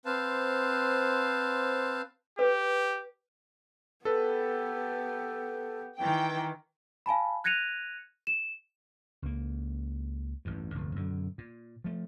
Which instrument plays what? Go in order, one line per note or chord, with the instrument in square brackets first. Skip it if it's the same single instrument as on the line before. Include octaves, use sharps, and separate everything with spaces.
[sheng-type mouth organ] C4 B4 C5 F5 A5
[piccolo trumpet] G4 [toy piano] B4
[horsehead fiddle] B3 G4 [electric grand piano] A4 B4
[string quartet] D#3 E3 [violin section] G5
[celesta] F5 G#5 A5 B5
F#6 G#6 A#6 C#7 D#7 F7
E7
[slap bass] C#2 A#3
A1 E2 G2
F1 D2 G2
F#2 B2 D3
A#2
F3 A3